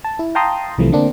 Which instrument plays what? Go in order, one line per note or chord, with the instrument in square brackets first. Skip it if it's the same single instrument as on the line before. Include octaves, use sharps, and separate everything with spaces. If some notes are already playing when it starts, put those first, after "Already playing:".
[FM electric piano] A5
E4
F5 G5 A5 A#5 C6 D#6
C2 C3 E3 F3 A3
D3 A#3 C4 D4